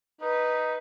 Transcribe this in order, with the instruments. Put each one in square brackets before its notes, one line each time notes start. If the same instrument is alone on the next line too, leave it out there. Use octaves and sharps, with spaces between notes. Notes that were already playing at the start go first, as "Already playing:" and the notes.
[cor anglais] D#4 [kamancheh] B4